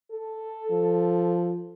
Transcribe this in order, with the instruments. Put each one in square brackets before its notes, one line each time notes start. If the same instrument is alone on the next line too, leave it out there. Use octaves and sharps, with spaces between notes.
[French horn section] A4
[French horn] F3